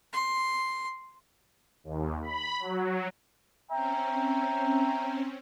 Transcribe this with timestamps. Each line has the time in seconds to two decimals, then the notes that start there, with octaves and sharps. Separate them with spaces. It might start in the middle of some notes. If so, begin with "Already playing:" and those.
0.13 C6
1.84 D#2
2.23 B5
2.59 F#3
3.70 C4 C#4 E5 G5 A#5